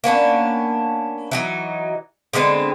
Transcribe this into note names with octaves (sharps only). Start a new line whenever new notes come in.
A#3 B3 C#4 D4
E3 F#3 D#4
D3 G#3 B3 C4